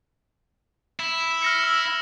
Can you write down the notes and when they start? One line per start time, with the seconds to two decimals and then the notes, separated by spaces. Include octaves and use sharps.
0.99 E4 E7
1.42 F6 A#6 C#7
1.64 E6